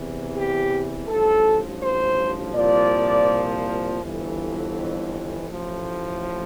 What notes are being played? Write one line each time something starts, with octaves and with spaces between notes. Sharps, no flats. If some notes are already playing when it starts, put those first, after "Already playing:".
Already playing: E2 C3 E3
G4
A1 G2 F3 A4
C5
C2 A#2 F3 D5
G1 F2 E3
A1 A2 F3